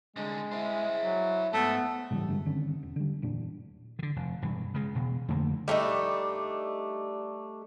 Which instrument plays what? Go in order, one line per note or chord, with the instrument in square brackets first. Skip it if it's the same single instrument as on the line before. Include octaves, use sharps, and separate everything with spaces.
[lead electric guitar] C2 D3 [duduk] G#3
[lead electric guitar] E4 C5
[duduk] F#3
[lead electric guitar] G#2 [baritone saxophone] A3 [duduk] B3
[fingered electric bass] G#2 C#3 E3 G3
G2 D3 G3 G#3
D3 D#3 C4 C#4
E1
D3 G3
F#1 E2 A#2 D4
[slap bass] D3 D#3
F1
E1 G2 E3
C#3 G#3
E1 B2
F2 D3 A3 A#3
[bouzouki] G3 A3 D4 D#4